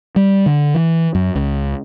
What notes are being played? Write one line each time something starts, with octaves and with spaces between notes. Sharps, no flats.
G3
D3
E3
F#2
C#2